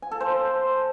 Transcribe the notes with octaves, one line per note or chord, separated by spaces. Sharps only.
G#5
A4
C5